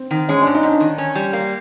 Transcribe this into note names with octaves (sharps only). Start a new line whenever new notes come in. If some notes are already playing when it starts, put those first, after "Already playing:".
Already playing: C4
D#3
G#3 C#4
G#2 D4
D#4
G#2
D4
D#3
C#4
G3
A#3